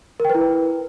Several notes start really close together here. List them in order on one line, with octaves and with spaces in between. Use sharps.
A#4 G5 B4 E4